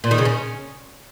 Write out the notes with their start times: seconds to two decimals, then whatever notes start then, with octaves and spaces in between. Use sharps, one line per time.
0.04 A#2
0.11 D#3
0.18 C#3
0.25 C#4